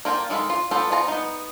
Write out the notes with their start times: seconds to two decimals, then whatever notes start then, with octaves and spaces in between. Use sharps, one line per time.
0.05 A#3 F4 A#4 G5 A5
0.30 D#3 G#3 A4 F5 B5
0.50 F4
0.71 B3 D4 F4 G4 A4
0.90 B3 F4 A5 A#5
1.08 B3 D#4